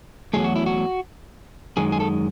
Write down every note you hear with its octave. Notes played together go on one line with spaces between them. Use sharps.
E2 C3 F#3 A3 G#4
F#4
E4
F#4
F#2 D#3 G#3 G#4
G#4
A4